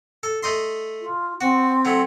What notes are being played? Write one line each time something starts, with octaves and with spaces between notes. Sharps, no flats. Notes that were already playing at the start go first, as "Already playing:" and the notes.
A4
A3 D#5 C6
F4
C4 F#4
F#3 A3